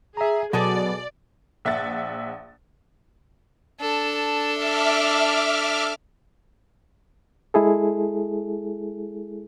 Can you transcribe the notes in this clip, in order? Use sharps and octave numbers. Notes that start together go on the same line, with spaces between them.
G#4 E5 A#5
B2 F#3 F#4 G#4 A4 D5
A#1 E5 F#5 A6
D4 A4
E5 D6 F6
G#3 E4 G#4 A4